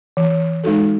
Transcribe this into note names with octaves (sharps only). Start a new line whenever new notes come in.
E3
G#3 D#4 F#4 A4